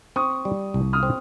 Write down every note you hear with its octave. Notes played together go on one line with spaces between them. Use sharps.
C4 C#6 D#6
G3
C2
D#6 F6
C4